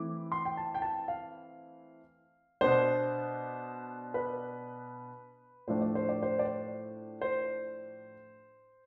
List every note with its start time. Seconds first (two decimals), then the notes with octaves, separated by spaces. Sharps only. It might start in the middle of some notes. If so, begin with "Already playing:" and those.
Already playing: E3 A3 C4 E4 D6
0.32 C6
0.45 G5
0.57 A5
0.75 G5
0.82 A5
1.08 F5
2.61 B2 B3 D4 C5
4.14 B4
5.68 A2 F3 A3 D4 C5
5.82 D5
5.95 C5
6.09 D5
6.22 C5
6.39 D5
6.45 C5
7.21 C5